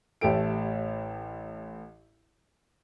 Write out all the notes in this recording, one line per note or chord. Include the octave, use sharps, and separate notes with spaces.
A1 A3 G4 A4 D7